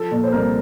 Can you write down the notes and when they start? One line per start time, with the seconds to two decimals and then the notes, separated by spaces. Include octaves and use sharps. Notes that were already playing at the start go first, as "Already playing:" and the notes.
Already playing: F3 A4
0.11 A#2
0.24 C5
0.32 C2 A#4